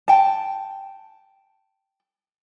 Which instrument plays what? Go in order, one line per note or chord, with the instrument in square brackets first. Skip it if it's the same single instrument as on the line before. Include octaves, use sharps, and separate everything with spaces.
[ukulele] G5 A5